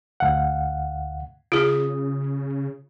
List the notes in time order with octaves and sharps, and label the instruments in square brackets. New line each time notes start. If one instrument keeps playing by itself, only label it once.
[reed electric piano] D2 F5 F#5
[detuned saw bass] C#3 [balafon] F4 G#4 [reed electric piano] D#6